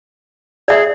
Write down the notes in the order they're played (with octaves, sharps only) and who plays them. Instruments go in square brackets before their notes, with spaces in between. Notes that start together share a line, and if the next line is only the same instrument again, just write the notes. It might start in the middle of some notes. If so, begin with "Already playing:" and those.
[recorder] G#4 [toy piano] D5 E5